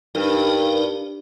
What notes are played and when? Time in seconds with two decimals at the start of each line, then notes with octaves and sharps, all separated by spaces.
0.15 G2 D#4 A#4